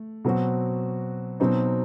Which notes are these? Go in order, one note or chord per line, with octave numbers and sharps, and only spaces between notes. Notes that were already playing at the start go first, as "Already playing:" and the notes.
Already playing: A3
B2 F#3 C4 F#4
B2 F#3 C4 D#4